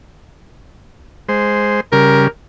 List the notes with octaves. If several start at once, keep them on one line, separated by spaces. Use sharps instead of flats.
G#3 C5
C#3 G3 A#4